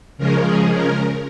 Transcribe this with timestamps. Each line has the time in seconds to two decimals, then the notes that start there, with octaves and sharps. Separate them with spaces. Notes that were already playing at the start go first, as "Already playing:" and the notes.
0.17 C#3 F3 G#3 C#4 A#4
0.45 G#4
0.74 A#4